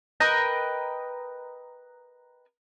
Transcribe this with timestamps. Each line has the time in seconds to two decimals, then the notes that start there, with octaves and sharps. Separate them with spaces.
0.20 A#4 B4 D#5 G5